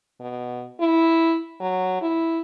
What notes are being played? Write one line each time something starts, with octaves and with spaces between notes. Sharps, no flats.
B2
E4
F#3
E4